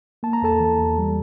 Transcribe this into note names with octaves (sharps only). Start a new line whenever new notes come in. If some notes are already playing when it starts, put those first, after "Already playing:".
A#3 A5
A#5
E2 A4 A5
E3
E2
G3